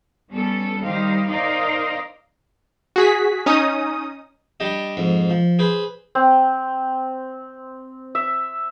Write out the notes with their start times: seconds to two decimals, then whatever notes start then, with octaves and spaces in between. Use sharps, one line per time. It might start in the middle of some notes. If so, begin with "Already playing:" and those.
0.32 G3 B3 C#4 A4
0.83 D#3 G3 D#4 G4 C5 F5
1.28 D#4 A#4 C5 D5 D#5 F5
2.96 F#4 G#4 B6
3.46 C#4 D#4 D#6
4.60 G3 D4 G4 D#5
4.97 F2 G#2
5.30 F3
5.59 G#4 B4 C5
6.15 C4
8.15 E5